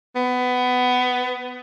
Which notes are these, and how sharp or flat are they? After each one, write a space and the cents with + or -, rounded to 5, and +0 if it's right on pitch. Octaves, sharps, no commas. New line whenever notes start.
B3 +20